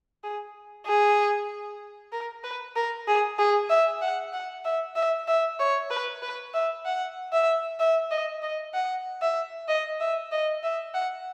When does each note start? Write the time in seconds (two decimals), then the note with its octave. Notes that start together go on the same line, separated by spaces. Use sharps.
0.24 G#4
0.87 G#4
2.13 A#4
2.44 B4
2.76 A#4
3.08 G#4
3.39 G#4
3.70 E5
4.02 F#5
4.33 F#5
4.65 E5
4.96 E5
5.28 E5
5.59 C#5
5.91 B4
6.22 B4
6.54 E5
6.85 F#5
7.33 E5
7.80 E5
8.11 D#5
8.42 D#5
8.74 F#5
9.21 E5
9.68 D#5
10.00 E5
10.32 D#5
10.63 E5
10.94 F#5